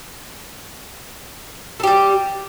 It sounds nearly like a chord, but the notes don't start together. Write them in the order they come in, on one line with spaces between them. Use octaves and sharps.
A4 G4 G3